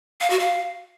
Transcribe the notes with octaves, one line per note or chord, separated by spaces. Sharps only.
F5
F#4
F5